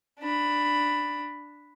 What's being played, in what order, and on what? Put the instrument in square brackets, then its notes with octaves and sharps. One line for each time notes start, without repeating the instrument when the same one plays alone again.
[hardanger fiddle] D4 B5